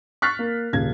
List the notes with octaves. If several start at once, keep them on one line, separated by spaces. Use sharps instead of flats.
C#6 F6 F#6 A6 B6 C7
A#3
D#1 C#3 G#6